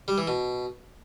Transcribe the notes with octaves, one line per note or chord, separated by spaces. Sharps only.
G3
E3
B2